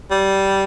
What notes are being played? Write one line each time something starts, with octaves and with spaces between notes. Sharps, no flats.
G3